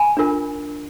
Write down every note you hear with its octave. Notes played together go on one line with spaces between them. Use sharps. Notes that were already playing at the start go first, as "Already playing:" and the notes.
Already playing: G#5 B5
D4 F4 A#4